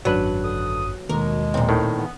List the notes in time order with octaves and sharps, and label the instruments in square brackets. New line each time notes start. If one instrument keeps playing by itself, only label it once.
[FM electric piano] G#1 F#2 F#6 [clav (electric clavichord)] F#3 B4 [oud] D4
[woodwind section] D3 A4 D#6
[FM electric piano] D#2 [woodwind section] B2 G#3 [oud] A#4
[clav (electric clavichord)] B1 [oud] A#2 C4
[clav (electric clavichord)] A2 D#3
[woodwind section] E3 B3